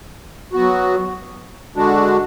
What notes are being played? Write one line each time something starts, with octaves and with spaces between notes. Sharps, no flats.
F#3 B3 F#4
D3 G#3 D4 F#4